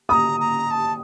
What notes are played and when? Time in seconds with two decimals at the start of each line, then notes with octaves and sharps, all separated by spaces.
0.09 A#5 B5 D#6
0.40 A#5
0.71 A5